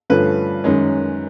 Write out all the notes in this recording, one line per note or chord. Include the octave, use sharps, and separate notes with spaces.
G2 D3 F3 A3 C#4 B4
F#2 D#3 G#3 C#4